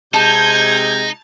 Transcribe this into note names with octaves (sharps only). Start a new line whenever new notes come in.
C3 G#3 D#4 A5 G6 G#6